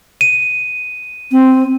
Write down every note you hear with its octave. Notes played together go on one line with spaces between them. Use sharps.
D#7
C4